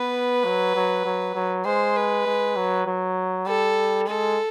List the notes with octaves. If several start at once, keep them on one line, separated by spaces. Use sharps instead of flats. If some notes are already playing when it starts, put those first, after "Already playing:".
Already playing: B3 B4
F#3
F#3
F#3
F#3
G#3 C5
B4
G#3
F#3
F#3
G3 A4
G#3 A4